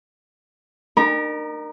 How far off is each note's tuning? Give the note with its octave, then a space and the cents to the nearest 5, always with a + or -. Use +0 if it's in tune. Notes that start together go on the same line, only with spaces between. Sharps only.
D#4 -40 A#4 +0 A#5 +45